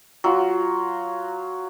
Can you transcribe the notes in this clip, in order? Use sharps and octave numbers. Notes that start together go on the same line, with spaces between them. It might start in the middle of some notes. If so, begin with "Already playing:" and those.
F#3 F4